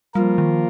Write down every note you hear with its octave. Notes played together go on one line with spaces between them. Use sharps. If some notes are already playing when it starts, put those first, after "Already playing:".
F3 G3 A#3 F4 A#4
D#3